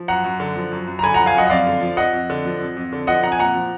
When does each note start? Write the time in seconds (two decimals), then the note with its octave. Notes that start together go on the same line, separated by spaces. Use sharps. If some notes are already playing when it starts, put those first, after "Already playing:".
Already playing: F3
0.08 F#2 F#5 A#5
0.24 F#2
0.40 D3
0.56 F3
0.71 F#2
0.88 F#2
0.99 A#5
1.03 D3 G#5 B5
1.14 F3 F#5 A#5
1.26 F5 G#5
1.34 F#2 D#5 F#5
1.47 D#5
1.50 F2 D5 F5
1.66 D3
1.81 F3
1.97 F2 D#5 F#5
2.13 F2
2.30 D3
2.45 F3
2.60 F2
2.77 F2
2.92 D3
3.07 F3 D#5 F#5
3.23 F2 F#5 A#5
3.32 G#5
3.39 A#2 F#5 A#5
3.55 F3